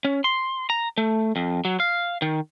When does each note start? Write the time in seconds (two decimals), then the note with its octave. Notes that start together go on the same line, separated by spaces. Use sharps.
0.05 C#4
0.24 C6
0.70 A#5
0.98 A3
1.36 F2
1.65 F#3
1.80 F5
2.22 D#3